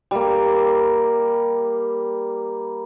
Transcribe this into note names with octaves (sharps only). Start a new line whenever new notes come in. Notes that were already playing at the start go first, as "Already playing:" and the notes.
G3 A#3